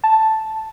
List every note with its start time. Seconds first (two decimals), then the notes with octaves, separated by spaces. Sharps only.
0.04 A5